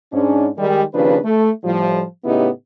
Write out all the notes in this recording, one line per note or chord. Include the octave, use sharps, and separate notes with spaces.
G#2 C#4 D4
D#3 G3 G#3
D#2 C#3 F3 D4 B4
A3
A2 F3 G3
A2 C#3 B3 D#4 E4 G4